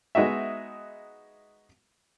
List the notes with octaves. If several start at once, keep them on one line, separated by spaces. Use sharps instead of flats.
G#3 B3 D#4 F#4 E5